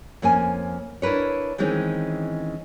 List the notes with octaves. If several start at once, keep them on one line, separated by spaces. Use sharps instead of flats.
F2 A#3 C#4 G#5
D4 E4 A#4 B4 C#5
D#3 E3 G#3 C4 C#4 D#4